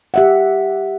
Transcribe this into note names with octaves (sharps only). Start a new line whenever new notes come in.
G4 E5 F#5